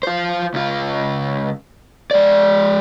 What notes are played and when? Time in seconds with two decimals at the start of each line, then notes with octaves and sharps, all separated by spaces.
0.03 F4 C5
0.54 C#2 F4
2.11 G#3 D5